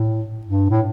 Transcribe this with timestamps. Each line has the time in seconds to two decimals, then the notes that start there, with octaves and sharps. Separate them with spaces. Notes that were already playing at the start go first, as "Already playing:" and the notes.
Already playing: A2
0.47 G2
0.70 A2